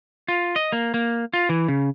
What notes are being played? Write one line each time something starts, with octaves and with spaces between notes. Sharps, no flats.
F4
D#5
A#3
A#3
F4
E3
C#3